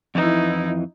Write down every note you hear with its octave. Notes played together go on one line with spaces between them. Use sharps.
F2 E3 D#4 E4